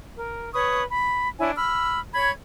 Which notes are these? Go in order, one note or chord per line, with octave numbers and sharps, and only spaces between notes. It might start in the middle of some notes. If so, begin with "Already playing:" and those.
A#4
B4 C#5 C#6 D#6
B5
D4 E4 C#5 G#5
B5 E6 F6
C#5 B5 G#6